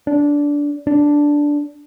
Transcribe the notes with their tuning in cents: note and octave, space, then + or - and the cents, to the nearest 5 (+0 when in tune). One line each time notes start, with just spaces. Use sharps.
D4 -15
D4 -5